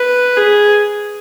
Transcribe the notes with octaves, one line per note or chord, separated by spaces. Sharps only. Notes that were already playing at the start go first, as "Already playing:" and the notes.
Already playing: B4
G#4